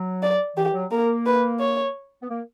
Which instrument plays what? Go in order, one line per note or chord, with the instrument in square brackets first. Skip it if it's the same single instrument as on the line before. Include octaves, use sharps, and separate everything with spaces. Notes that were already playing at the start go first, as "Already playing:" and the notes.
Already playing: [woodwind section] F#3
[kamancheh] D5
[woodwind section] E3 [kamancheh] G4
[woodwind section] F#3
[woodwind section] A#3 [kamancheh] A#4
[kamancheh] B4
C#5
[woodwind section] B3
A#3